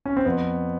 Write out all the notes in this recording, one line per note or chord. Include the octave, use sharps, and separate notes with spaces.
C#4
C4
F2 B3